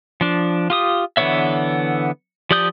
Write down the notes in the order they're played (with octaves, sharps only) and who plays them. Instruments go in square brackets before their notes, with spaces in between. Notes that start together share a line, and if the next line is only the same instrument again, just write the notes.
[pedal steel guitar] F3 D4
F4 G4 D#6
D3 E3 B3 C#5 E5
F3 G4 D5 D#6 G6